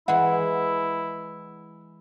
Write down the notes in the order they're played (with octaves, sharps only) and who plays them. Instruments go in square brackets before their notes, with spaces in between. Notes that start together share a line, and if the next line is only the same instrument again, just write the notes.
[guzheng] E3 G#3 [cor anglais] E4 [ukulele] F#5